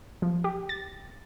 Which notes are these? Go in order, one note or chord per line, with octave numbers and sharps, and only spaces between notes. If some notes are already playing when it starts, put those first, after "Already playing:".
F3
G4
A6